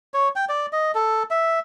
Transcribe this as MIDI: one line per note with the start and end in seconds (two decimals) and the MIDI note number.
0.14 0.29 73
0.36 0.45 79
0.49 0.66 74
0.73 0.92 75
0.95 1.23 69
1.31 1.60 76